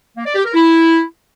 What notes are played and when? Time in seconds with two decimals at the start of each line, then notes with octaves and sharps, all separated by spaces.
0.16 A#3
0.26 D5
0.35 G4
0.44 A#4
0.54 E4